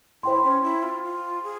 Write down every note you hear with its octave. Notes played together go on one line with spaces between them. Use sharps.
E4 C5 G5 C6
C#4
E4
F4
F4
G#4